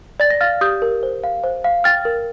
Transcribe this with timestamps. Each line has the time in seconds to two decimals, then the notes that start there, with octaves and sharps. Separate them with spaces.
0.20 D5 A6
0.30 A#6
0.41 F5 F6 A6
0.61 G4 D#6 G6
0.82 A#4
1.03 C5
1.24 F5
1.44 C5
1.65 F5
1.84 G5 F6 A6
2.05 A#4